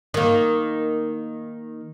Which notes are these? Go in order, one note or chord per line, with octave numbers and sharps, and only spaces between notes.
D#3 A#3